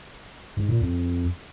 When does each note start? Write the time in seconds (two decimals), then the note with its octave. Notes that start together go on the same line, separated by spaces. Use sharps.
0.57 G#2
0.69 A#2
0.81 F2